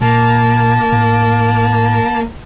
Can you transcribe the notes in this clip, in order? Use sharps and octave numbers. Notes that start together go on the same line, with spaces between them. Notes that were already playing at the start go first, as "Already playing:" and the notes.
A#2 A#3 A5
A2